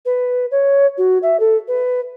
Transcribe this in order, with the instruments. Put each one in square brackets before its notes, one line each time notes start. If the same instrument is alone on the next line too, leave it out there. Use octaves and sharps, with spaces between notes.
[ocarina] B4
C#5
F#4
E5
A4
B4